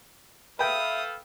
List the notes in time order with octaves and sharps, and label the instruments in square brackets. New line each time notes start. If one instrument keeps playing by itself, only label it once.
[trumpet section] A4 F5 [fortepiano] B4 G5 B5 [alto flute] E5 [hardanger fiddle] D#6